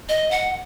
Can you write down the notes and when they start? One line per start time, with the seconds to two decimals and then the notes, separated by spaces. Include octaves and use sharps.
0.09 D#5
0.31 F#5